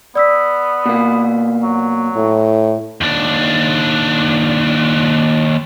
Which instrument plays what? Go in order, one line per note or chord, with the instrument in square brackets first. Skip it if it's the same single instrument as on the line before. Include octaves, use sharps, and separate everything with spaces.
[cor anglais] B3 [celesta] D5 E6 B6
[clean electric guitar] B2 A#3
[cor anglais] F#3
[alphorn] A2
[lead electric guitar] D#2 D4